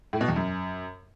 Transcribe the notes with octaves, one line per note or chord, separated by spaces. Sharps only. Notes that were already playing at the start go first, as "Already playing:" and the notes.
A2
B2
E2
F#2